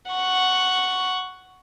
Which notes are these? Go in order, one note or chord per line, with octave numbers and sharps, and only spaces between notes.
F#5 C#6